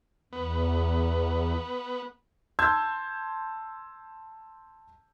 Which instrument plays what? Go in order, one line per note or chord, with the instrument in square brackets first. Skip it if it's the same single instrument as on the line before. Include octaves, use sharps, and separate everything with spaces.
[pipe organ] E2 [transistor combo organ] B3
[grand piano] A5 C6 E6 G6 G#6